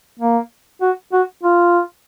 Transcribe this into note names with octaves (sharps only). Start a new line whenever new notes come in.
A#3
F#4
F#4
F4